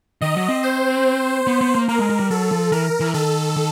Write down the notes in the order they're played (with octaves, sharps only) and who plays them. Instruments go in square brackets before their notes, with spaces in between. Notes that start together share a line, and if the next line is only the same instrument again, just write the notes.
[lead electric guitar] D#3 [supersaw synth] D#5
[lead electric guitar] F#3
C4
[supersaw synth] C5
[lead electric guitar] B3
B3
A#3
[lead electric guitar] A#3 [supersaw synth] A#4
[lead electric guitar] G#3
G#3
G3
[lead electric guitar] F#3 [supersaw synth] A4
[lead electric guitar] F3
[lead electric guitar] E3 [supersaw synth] A#4
[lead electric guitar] E3
[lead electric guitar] D#3 [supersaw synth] A4
[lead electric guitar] D#3